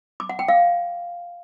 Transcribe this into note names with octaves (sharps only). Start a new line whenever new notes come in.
D6
F#5
G5
F5